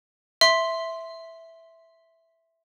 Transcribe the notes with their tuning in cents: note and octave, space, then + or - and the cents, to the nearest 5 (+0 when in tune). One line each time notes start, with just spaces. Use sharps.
E5 +0 C6 +0